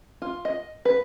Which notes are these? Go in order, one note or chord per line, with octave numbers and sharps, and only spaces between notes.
F4
D#5
B4